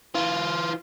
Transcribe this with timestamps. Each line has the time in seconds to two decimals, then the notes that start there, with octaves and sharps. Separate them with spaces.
0.15 E3 F4